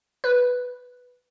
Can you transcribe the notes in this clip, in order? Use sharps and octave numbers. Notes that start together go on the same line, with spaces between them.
B4